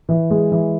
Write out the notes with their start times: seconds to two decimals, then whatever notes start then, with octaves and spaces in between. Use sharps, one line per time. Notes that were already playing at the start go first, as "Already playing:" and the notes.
0.09 E3
0.30 G#3
0.52 E3